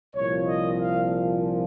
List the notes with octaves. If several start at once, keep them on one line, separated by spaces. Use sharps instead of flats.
C2 A#2 F3 C#5
D#5
F5